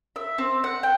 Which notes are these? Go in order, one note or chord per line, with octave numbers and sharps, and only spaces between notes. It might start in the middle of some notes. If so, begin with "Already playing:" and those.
E5
C4
F#5
G5